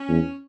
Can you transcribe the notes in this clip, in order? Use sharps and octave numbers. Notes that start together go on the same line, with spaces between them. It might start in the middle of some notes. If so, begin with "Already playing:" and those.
Already playing: C#4
E2